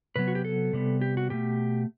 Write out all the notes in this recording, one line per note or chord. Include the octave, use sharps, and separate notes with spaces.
C3 F#3 B3 B4
F#4
G4
A4
C3 G3 B3
G4
F#4
B2 A3 G4